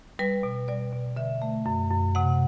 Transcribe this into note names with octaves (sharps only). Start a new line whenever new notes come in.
G3 B4
B2
G3 D5
B2
D3 E5
A3
F#2
F#2
C3 F#5